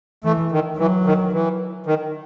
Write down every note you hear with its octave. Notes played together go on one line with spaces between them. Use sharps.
E3 A3
D#3
E3 F#3
D#3
E3
D#3